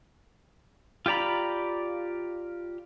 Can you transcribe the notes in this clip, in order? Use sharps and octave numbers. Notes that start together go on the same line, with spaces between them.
F4 G4 D5 A#5 B5